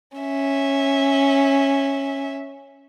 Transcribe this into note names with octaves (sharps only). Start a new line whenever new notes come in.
C#4 E5